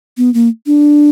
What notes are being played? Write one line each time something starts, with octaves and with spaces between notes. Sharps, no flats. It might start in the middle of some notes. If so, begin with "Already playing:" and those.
B3
A#3
D4